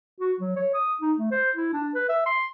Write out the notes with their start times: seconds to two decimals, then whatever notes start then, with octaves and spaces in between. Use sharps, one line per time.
0.20 F#4
0.40 F#3
0.56 C#5
0.74 D#6
1.02 D#4
1.18 A3
1.31 C5
1.56 E4
1.73 D4
1.95 B4
2.09 E5
2.26 C6